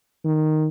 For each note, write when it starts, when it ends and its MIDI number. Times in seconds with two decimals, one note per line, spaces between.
0.25 0.67 51